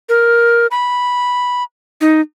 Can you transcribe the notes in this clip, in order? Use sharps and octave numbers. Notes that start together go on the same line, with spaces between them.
A#4
B5
D#4